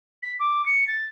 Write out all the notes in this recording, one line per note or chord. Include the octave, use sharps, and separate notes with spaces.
B6
D6
C#7
A6